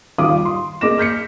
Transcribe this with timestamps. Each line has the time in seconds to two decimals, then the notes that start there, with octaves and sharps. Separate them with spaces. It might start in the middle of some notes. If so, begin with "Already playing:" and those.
0.18 D#2 G3 F4 F5 D6 D#6
0.45 C6
0.81 A#3 G#4 D#5 D6 A#6 E7
0.98 F6 G6 B6 C#7